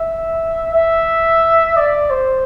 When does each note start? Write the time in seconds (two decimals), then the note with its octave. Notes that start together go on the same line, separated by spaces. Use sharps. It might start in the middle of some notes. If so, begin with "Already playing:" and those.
Already playing: E5
0.74 E5
1.77 D5
2.10 C5